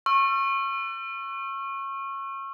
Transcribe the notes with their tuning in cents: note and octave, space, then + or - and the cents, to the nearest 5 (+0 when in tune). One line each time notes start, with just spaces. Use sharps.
C#6 -25 E6 +40